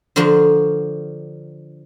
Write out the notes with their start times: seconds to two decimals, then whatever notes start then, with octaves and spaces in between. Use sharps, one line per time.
0.16 D3 F3 F4 F#4 A#4